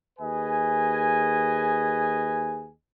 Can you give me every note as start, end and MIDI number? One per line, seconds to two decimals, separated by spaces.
0.19 2.70 39
0.19 2.70 68
0.19 2.70 71
0.19 2.70 75
0.19 2.70 80